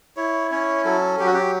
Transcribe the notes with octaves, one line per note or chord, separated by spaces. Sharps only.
E4 C#5
C#4 C#5
F#3 A4
F#3 G4
F#4
G4